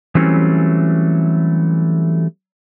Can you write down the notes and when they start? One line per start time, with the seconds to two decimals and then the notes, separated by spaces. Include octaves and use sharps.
0.15 E3 F#3 G3 A3 C4 C#4